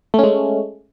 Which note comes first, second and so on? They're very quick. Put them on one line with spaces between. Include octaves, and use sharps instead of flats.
A3 C#4 G#3